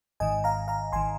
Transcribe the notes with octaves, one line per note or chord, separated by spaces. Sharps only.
G#1 G#2 D#3 D#5 G#5
F5 A#5
F5 A#5
G#1 D#3 G#5 C6